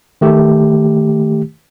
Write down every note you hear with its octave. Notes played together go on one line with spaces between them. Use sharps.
D#3 A3 G4